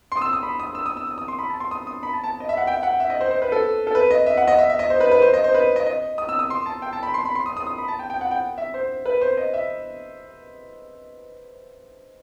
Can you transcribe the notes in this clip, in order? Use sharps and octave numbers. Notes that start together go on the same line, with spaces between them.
C6
D#6
E6
D#6
B5
D#6
E6
D#6
E6
D#6
D#6
C6
B5
A5
C6
D#6
D#6
B5
A5
A5
D#5
E5
F#5
G5
E5
F#5
E5
D#5
C5
C5
B4
A4
A4
B4
D#5
E5
F#5
D#5
E5
E5
D#5
C5
B4
B4
C5
D#5
C5
B4
D#5
D#5
D#6
E6
D#6
C6
A5
G5
A5
B5
C6
B5
C6
D#6
D#6
D#6
B5
A5
G5
G5
F#5
G5
E5
C5
B4
C5
D#5
E5